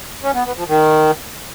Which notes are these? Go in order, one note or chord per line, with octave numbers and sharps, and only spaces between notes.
C#4
B3
B3
F3
D#3